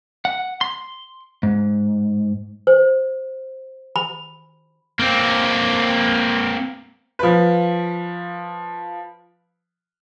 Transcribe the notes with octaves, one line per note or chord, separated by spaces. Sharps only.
F#5
C6
G#2
C5
B5
A#3 C4
F3 B4